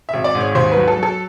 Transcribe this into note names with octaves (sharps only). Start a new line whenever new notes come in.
E5
G#1
D5
G#2
C#5
D#2 C5
F#3 B4
A4
F#3
A4